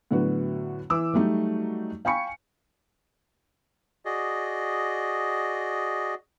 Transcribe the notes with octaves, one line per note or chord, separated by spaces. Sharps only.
A2 D3 F#3 B3 F#4
E3 D6 E6
F#3 G3 A3 D#4
F5 G5 G#5 B5 C#6 C#7
F#4 G#4 D5 D#5